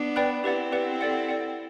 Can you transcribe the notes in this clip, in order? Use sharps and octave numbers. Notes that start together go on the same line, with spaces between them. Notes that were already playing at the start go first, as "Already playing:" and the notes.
Already playing: B3 D4
B4 D5 G5 B5 F#6
C4 E4 G4 B4 D5 F#5
G4 B4 D5 F#5
A4 D5 F#5
A4 D5 F#5